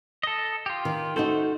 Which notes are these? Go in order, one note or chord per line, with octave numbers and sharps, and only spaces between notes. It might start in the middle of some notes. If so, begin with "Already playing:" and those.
A4 D#5
F4 G4
D#3
A3 D#4 F#4 A4 C5